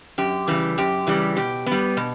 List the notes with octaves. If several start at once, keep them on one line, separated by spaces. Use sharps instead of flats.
F#2 G4
C#3 E3 G3
F#2 G4
C#3 E3 G3
B2 G4
B3
G3
B2